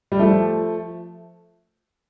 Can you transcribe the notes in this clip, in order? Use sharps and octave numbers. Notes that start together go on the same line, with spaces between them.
G3
F3 A3